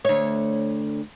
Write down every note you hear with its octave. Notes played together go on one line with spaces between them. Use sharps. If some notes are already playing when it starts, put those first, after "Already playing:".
D2 C#5